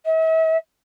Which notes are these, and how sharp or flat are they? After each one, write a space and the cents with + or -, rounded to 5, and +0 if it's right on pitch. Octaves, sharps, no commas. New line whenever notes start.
E5 -40